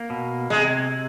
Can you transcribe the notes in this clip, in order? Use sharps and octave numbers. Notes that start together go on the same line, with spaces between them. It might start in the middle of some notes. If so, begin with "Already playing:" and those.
Already playing: A#3
B2
C3 G#3